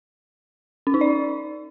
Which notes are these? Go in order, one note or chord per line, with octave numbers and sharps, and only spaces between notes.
C#4
D#4
D5